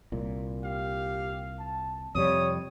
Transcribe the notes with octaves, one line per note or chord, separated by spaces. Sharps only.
C2 A#2
G4 F5
A5
F2 C3 G3 C#5 D#6